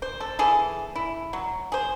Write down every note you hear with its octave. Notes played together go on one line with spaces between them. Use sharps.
C5
A4
E3 G#4 A4
E4
F#3
G#4 C5